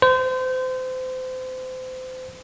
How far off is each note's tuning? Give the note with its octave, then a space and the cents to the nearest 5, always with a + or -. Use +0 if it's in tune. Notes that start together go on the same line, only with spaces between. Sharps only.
C5 -30